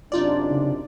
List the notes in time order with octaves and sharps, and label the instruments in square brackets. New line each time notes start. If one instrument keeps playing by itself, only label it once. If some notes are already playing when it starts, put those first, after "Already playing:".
[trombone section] F#2 C3 D4 [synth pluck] D#4 F4 D5
[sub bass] C#3